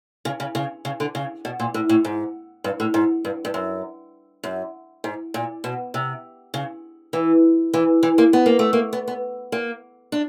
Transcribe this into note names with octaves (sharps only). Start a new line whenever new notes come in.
C#3
C#3
C#3
C#3
D3
C#3
B2
A#2
A2
A2
G#2
G2
A2
G#2
G2
G2
F#2
F#2
G#2
A#2
B2
C3
C#3
E3
E3
E3
A#3
B3
A#3
A3
A#3
B3
B3
A#3
D4